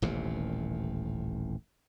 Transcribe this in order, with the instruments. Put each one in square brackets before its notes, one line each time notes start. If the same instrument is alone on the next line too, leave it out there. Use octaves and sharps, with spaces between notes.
[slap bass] D#1 A1 D#2 C3